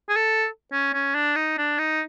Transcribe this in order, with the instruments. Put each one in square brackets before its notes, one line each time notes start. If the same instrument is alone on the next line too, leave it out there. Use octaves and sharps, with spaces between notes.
[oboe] G#4
A4
C#4
C#4
D4
D#4
D4
D#4